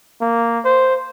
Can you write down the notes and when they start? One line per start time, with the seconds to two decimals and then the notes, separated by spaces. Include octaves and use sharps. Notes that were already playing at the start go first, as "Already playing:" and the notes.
0.21 A#3
0.65 C5